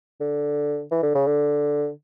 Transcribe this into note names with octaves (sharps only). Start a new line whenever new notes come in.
D3
E3
D3
C#3
D3